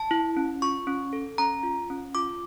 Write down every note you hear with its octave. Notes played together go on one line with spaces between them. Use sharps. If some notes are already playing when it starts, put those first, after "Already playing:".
Already playing: A5
E4
C#4
F4 C#6
C#4
A4
C#4 A#5
F4
C#4
F4 D6